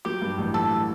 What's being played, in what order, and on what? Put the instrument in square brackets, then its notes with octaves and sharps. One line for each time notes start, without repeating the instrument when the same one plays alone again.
[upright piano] F#3 [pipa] G4
[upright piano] G2
A1
[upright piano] A1 [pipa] A4